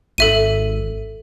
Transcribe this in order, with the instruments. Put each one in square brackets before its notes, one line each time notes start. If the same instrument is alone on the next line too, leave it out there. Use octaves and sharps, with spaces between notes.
[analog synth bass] G#1 [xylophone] A4 E5 D#7